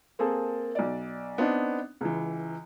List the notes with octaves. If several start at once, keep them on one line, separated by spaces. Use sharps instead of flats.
A#3 C4 G#4 A4
B1 D5
B3 C4 D4 D#4
C#2 E3